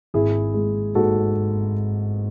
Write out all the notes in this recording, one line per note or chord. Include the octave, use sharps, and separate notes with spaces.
G#1 E4 G#4
G#3
G#2 F#4 A4